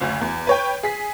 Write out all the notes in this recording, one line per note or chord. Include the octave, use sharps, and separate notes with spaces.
F#1 D2
E2
B4 C#5 G5
G#4 B6